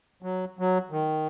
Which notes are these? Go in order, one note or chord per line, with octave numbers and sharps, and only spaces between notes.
F#3
F#3
D#3